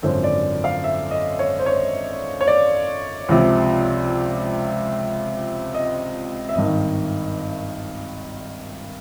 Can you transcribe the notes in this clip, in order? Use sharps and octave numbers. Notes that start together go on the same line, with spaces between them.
G#1 F#2 D3 F3 C5
D5
F5
E5
D#5
C#5
C5
C#5
C#5
D5
C#2 C3 F3
D#5
E5
G#1 G2 D#3 D#5